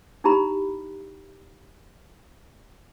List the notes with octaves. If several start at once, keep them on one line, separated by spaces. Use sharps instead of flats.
D#4 E4 G4 A#5 B5